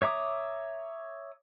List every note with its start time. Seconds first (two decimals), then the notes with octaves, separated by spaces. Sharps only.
0.02 C#5 E5 A#5 D6 D#6